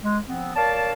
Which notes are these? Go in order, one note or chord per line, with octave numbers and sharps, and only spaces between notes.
G#3
F3 B3 C4
A#4 C#5 D5 F5 A5